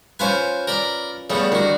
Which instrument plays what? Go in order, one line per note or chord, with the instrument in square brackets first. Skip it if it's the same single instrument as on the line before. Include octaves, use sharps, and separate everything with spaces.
[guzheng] C#4 F4 B4 [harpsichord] C5 F5 G#5
[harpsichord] A#4 D5 B5
[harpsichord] C#3 A3 B3 [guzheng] G3
[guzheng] D3 [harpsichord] D#3 F#4